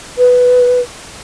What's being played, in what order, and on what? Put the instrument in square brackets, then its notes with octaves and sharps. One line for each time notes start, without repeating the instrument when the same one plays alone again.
[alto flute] B4